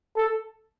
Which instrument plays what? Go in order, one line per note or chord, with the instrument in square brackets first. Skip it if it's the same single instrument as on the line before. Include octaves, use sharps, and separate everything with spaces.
[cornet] A4